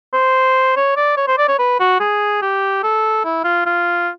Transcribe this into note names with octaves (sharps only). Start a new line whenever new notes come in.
C5
C#5
D5
C#5
C5
D5
C#5
B4
F#4
G#4
G4
A4
E4
F4
F4